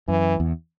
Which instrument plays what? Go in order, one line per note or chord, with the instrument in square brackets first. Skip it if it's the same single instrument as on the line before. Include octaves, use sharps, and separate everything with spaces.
[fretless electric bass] F#2 [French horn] E3
[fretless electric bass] E2